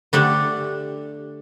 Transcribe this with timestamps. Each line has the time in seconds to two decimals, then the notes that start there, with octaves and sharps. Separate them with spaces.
0.13 D3 A3 D4 G4